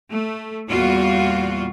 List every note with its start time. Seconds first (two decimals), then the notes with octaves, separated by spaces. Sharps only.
0.10 A3
0.70 E2 A#2 G3 F4 F#4